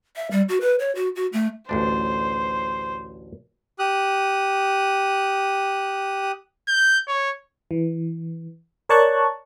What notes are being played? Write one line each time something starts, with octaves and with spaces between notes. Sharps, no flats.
E5
G3
F#4
B4
C#5
F#4
F#4
A3
A1 D2 D4 C5
G4 D#6 F#6
G6
C#5
E3
A#4 C#5 D5 A5 C#6 F#6